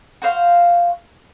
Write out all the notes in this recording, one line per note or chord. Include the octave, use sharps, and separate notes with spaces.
F#4 C5 F5